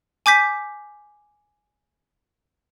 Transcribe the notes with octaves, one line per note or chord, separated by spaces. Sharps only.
G#5 D6 G6 B6